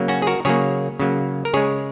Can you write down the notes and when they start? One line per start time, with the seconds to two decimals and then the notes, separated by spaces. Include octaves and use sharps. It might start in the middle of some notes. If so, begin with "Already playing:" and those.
Already playing: C#3 F#3 A#3
0.08 C#4 F#4
0.22 G#4
0.27 F#4 A#4
0.45 C#3 F#3 A#3 G#4 C#5
1.00 C#3 F#3 A#3
1.45 A#4
1.53 C#3 G#3 G#4 C#5